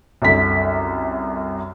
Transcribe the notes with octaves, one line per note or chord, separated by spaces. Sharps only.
C2 F#2 D3 B6